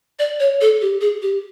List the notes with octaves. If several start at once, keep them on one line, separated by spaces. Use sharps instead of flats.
D5
C#5
A4
G4
G#4
G4